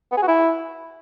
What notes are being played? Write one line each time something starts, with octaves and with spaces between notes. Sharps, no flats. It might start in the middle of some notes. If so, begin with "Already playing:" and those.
B3
G#4
F#4
E4